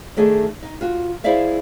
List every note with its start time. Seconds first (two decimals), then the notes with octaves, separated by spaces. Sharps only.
0.17 D#3 A3 D4 G#4
0.63 D#4
0.81 F4 F#4
1.24 E4 G#4 C5 D5 E5 F5